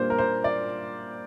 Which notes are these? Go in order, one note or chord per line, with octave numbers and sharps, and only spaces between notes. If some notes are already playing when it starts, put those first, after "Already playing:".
Already playing: A#2 G3 A#3 D4 F4 C5
A#4
C5
D5